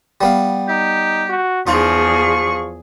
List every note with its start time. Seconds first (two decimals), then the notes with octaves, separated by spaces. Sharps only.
0.21 G3 B3 F5
0.69 D#4 G4
1.29 F#4
1.67 E2 F3 D#4 F4 G#4 C#6